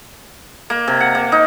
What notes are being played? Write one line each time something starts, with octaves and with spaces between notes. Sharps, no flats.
A#3
C3
F#5
A#3
D#4